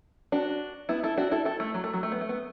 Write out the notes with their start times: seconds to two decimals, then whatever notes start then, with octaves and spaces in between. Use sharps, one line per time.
0.32 D4 F#4
0.89 B3 E4
1.03 E4 A4
1.18 D4 F#4
1.31 E4 A4
1.45 E4 A4
1.60 A3
1.74 F#3
1.84 A3
1.93 F#3
2.03 A3
2.12 B3
2.21 A3
2.29 B3